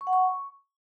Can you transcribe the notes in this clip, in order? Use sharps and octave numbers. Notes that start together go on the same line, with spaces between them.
C#6
F#5
C#6